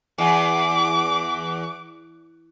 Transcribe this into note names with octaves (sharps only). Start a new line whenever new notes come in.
E2 D6